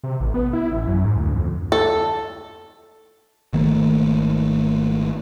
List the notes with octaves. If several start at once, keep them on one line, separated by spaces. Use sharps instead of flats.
C3
A1
B3
E4
A1
F#2
G#2
D2
F2
A4
G#1 D#3 A3 A#3